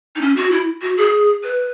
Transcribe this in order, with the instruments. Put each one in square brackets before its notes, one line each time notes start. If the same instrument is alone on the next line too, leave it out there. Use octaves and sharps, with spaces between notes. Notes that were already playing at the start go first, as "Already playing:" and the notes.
[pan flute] D#4
C#4
F#4
E4
F#4
G#4
B4